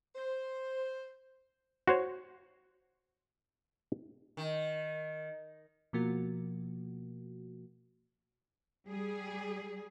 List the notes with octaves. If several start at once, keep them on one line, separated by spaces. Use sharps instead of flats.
C5
F#4 C5 C#5
D#3
B2 F3 A#3 F#4
G3 G#4